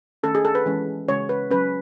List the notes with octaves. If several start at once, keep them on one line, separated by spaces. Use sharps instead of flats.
D#3 A3 C#4 A4
G#4
A4
B4
E3 G#3 C#4
C#3 G#3 C#4 C#5
B4
F#3 C#4 B4